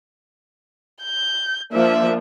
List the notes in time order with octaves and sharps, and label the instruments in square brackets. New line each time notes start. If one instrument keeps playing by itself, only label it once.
[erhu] G6
[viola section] F3 A#3 D4 [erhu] E5